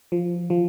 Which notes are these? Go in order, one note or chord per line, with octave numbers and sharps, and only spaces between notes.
F3
F3